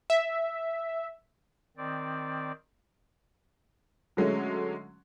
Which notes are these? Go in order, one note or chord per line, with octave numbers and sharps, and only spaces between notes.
E5
D#3 C4 D5
D3 F#3 G#3 A3 C#4